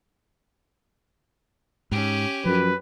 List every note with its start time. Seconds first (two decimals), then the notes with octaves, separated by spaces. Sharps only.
1.92 G#2 C#4 G4
2.45 F#2 F3 B4